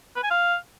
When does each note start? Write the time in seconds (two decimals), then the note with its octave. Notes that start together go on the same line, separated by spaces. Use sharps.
0.16 B4
0.23 G#5
0.31 F5